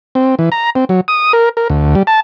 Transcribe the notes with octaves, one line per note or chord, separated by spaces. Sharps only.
C4
E3
A#5
C4
F#3
D#6
A#4
A#4
D2
G3
A5